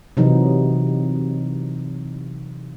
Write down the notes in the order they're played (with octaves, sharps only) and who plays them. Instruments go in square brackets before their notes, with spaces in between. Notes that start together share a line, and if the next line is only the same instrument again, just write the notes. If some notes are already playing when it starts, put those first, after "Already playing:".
[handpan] C3 E3 F#3 D#4